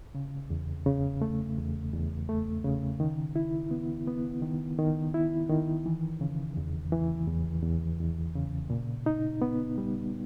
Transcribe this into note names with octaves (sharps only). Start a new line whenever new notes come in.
C#3
E2
C#3
A3
E2
E2
A3
C#3
D#3
E4
B3
B3
D#3
D#3
E4
D#3
E3
C#3
E2
E3
E2
E2
E2
C#3
A#2
D#4
B3
G3